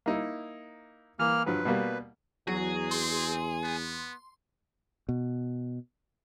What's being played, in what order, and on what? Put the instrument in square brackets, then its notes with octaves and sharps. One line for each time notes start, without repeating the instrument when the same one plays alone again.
[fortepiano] A#3 D#4 E4
[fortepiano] E3 [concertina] A#3 F6
[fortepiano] G2 F3 F#3 [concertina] B4
[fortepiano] B2 G3 A#3
[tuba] E2 [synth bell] F#3 F#4 [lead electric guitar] G#4
[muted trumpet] C4 [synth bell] C6
[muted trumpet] B3
[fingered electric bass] B2